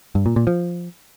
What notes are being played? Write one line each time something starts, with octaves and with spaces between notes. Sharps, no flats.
G2
A#2
A#2
F3